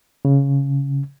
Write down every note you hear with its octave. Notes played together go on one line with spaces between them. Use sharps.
C#3